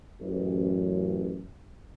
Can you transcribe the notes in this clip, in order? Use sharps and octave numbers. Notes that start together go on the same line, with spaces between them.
A1 F#2